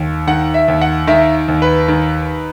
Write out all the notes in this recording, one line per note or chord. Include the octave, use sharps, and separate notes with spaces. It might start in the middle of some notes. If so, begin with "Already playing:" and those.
Already playing: D#2
D#3 F#5
E5
D#2
F#5
D#3 E5
D#2
B4
D#3